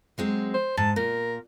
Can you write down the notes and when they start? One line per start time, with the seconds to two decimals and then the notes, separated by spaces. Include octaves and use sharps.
0.18 F#3 G#3 C4
0.54 C5
0.77 G#2 A5
0.96 A#2 A#4